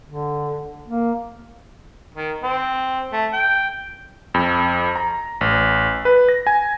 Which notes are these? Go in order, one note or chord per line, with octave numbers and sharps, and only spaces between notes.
D3
A#3
D#3
C4
A3
G5
F2
A#5
A1
B4
A#6
G#5